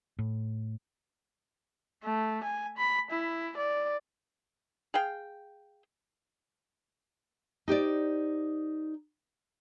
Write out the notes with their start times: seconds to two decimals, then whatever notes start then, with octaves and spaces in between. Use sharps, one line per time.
0.19 A2
2.04 A3
2.44 G#5
2.78 B5
3.11 E4
3.57 D5
4.94 G#4 F5 G5
7.68 D#4 G4 C5 D5